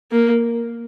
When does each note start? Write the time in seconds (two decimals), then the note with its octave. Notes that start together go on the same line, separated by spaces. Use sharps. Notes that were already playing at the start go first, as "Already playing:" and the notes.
0.11 A#3